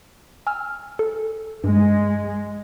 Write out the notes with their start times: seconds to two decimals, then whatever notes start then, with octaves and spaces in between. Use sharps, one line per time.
0.47 G#5 E6 F6
0.99 A4
1.64 G2 G#3